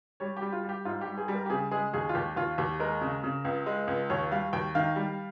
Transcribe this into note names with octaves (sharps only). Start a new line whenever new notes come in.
G3 C#5
G4
G3
F4
G3
G4
G#2 F4
G4
G3
G#4
G3
A#4
G4
C#3 G#4
G#3 G#4
D#2 G#4
F4
D#2 G4
D#2 F4
D#2 G4
G#3 A#4
C#3
C#3
C#2
G#3
C#2
D#2 C#5
G3 F5
D#2 G5
D#3 F5
G3